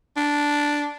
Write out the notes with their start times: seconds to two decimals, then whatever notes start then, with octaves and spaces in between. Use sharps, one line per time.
0.17 D4